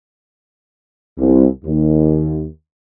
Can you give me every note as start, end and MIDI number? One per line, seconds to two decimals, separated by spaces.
1.18 1.47 36
1.65 2.46 39